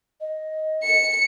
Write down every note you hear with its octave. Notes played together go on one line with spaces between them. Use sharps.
D#5
C#7